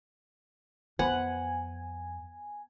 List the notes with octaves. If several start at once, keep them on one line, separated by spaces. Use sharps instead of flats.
F2 B3 B4 C5 F#5 G#5